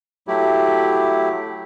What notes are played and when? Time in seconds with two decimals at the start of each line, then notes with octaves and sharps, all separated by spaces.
0.28 F#3 A3 E4 G4